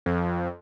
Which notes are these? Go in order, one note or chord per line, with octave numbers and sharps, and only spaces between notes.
F2